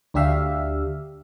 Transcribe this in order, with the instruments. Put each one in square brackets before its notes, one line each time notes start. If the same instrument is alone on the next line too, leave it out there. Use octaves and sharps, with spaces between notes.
[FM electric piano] D2 D4 G4 E5 F5